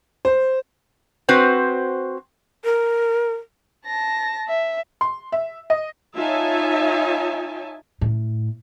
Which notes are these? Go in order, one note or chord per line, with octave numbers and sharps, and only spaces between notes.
C5
C4 F#4 B4 C5
A#4
A5 A#6
E5
C6
E5
D#5
D#4 F4 C#5 E5 G#5 A5
A2